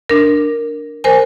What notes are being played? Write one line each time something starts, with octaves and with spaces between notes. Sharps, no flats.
D4 A#4
A#4 C5 G#5